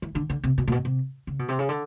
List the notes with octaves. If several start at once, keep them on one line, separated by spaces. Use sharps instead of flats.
E3
D3
D3
C3
B2
A#2
B2
C3
C#3
B2
C3
C#3
D3